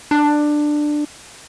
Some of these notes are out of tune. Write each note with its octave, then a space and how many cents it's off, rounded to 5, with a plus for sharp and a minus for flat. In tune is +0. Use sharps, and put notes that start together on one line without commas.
D4 +15